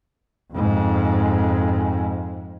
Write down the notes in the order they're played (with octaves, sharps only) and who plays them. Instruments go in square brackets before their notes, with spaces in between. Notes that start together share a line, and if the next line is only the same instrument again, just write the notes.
[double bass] F2 G#2